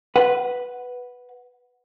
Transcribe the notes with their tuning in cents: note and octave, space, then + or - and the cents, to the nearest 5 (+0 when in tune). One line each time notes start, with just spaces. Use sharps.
B4 +0 F#5 +0